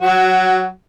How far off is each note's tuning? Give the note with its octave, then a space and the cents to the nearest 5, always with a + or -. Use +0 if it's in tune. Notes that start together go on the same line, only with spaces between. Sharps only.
F#3 +0 F#4 +15